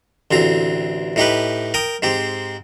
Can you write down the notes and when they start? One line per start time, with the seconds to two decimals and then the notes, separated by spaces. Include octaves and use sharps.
0.31 A1 D2 C4 A#5
1.16 A2 D#4 G4 B4
1.74 A#4 G5 D#6
2.02 G#2 C4 G4